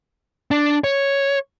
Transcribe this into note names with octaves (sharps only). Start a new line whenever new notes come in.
D4
C#5